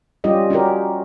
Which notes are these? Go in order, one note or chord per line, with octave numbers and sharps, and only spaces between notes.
G3 C#4 F4 G4 D#5
C#4 F#4 G4 A#4